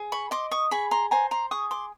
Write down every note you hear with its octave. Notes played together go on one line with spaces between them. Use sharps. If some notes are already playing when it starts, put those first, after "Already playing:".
Already playing: G#4
B5 C#6
D#5 C6 D6
C#6 D#6
G#4 B5 C#6
A#5 C6
C5 G#5 A#5
A#5 C6
G#4 C#6 D#6
C6 D6